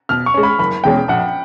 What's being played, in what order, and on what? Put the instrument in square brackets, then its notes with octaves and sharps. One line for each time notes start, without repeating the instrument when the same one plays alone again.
[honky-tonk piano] B2 [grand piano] F6
[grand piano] C#6
[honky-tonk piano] G#3 C#4
[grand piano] B5
[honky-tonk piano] F#1 [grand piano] B5
[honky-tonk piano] E2 B2 G#3 C#4 [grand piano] G5
[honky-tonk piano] A#1 [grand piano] F#5